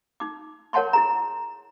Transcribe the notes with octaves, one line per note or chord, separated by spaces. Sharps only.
D#4 D6
A#4 C#5 F#5 A5 C6 C#6
E4 G#4 A#5